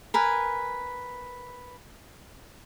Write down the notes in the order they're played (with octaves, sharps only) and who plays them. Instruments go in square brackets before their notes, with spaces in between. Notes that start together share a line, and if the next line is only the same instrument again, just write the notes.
[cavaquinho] A#4 B4 G#5